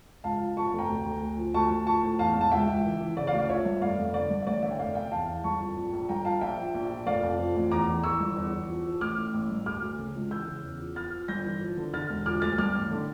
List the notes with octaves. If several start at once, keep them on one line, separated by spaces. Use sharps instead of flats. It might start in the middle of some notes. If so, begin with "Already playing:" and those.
C#2 F5 A5
F3
F3 A5 C#6
A5 C#6
F1
G5 A#5
D2
D2
D2
F3
D2 A5 C#6
D2
F3 A5 C#6
A2
E2 F5 A5
E1
A5
C#2 E5 G5
C#2
E3
E3
C#3 D5
D5 F5
D2
D5 F5
F3 C#5 E5
G2
F1 D5 F5
F1
D3 D5
G2
E5
A1 D5
D3 C#5 E5
G5
F1 D5 F5
F1 E5 G5
E2 F5 A5
E2
G1 A5 C#6
F2
A#1
A#1
G1 G5 A#5
F3 F5 A5
A#1 E5 G5
F3
A#1
A#2
F1 D5 F5
F2
F3
A1
E2 A#5 D6
E3
E3 C#6 E6
G1
E2
E2
F3
F3
A1 D6 F6
A2
A1
G2
D2 D6 F6
D2
C#3
C#2
E3 E6 G6
C#3
E2
F3
F3 F6 A6
F3
G1 G6 A#6
E3
F3
D3
D3 F6 A6
E1
F3 D6 F6
D2 F6 A6
G2 D6 F6
A1
D3